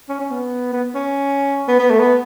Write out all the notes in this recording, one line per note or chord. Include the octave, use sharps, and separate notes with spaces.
C#4
C#4
B3
B3
C#4
B3
B3
A3
B3